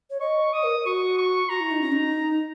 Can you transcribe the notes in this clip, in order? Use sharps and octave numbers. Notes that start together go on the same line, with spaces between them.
C#5
D#5 C#6
D#5 D#6
A#4
F#4 C#6
C#6
F#4 A#5
E4
D#4
C#4
D#4